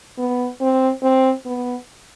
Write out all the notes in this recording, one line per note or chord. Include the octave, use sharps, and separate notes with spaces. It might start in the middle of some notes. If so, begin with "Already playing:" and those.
B3
C4
C4
B3